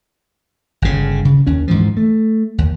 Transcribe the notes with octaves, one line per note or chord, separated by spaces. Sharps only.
G1 C#3
C#3
D#2 C#4
G#2 E3 F3
A3
D#2